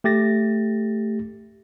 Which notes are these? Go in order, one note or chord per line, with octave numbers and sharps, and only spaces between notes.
A3 G4 A6 A#6